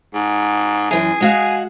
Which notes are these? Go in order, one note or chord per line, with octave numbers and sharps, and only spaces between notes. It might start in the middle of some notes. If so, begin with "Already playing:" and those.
G#2
F#2 E3 G#4
G#3 F#4 F5